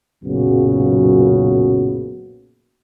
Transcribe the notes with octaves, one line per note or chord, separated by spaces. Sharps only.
B1 F#2 A#2 C#3 B3 F#4